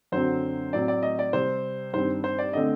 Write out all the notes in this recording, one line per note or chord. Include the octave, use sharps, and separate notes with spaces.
F#2 D3 F#3 C4 C5
A2 F#3 C4 D5
D5
D#5
D5
C3 G3 C4 C5
G2 D#3 G3 C4 C5
C5
D5
D3 A3 C4 D#5